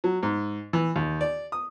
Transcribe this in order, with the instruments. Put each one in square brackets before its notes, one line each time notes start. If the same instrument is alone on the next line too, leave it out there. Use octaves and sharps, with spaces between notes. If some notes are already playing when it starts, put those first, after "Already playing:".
[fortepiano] F#3
G#2
E3
D#2
D5
D#6